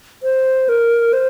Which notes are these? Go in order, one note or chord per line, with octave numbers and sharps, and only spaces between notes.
C5
A#4
C5